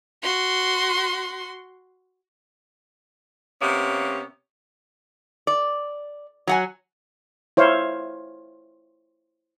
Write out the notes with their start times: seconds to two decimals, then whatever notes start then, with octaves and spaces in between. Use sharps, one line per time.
0.23 F#4 C6
3.61 C3 A#3 B3 C#4
5.47 D5
6.47 F#3 F#5 G#5
7.57 E4 C5 C#5 F5